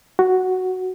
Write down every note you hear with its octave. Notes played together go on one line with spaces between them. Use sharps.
F#4